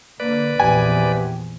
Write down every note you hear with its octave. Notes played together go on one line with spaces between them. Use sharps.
D3 A#3 B4 D5
A#1 E2 C3 B3 G4 G#5